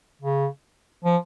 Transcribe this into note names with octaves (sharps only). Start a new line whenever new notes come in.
C#3
F3